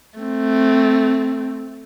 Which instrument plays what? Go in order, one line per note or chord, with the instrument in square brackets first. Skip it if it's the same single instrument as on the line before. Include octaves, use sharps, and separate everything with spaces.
[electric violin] A3 C4